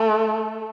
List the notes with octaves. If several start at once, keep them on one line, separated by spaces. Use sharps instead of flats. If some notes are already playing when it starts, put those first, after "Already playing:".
Already playing: A3